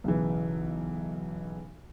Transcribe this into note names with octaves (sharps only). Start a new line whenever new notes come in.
B1 C#3 E3